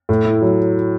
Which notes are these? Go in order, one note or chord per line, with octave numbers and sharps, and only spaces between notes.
A2
E4
F#3